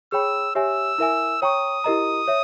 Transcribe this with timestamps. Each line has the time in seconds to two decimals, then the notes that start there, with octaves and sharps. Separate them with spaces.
0.12 G#4 C#5 G5 B5 E6
0.55 G4 C#5 E5 G#5 E6
0.98 E4 A#4 E5 G#5
1.42 C#5 G5 A#5 C#6 D#6
1.84 E4 G4 A#4 D#5 A#5
2.27 C#5 E5